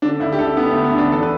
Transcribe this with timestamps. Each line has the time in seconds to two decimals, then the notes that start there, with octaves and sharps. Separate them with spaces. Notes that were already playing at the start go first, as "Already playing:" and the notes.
0.02 D3 D4
0.20 D2 E4
0.32 G4
0.38 D3 A4
0.57 D3 B3
0.71 A3
0.75 D2
0.84 B3
0.94 D3 D4
1.11 E2 A4
1.23 B4